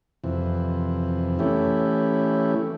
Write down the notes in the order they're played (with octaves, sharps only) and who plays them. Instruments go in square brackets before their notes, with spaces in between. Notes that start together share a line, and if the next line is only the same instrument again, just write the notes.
[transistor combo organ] F2 C3 E3
E3 A3 C#4 E4 G4